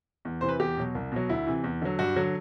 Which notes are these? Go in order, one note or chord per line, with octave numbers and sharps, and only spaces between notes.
E2
C3 E3 C5
B4
E2 G4
B2 F#3
C2
B2 F#3
D2 E4
C3 E3
E2
D3 F#3
G2 F#4
D3 F#3